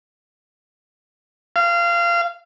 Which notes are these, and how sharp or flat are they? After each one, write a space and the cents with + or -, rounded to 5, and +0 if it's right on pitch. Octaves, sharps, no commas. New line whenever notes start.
F5 -25